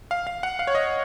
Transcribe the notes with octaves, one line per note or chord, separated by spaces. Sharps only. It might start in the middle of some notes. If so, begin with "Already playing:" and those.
F5
F5
F#5
F5
C#5
D#5